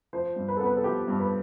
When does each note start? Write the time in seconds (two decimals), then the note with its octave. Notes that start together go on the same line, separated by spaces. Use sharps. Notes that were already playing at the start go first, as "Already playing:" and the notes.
0.13 F3 C5
0.36 G2
0.48 B4
0.57 A4
0.61 B3 B4
0.76 A4
0.84 F3 G4
1.08 G2
1.19 B4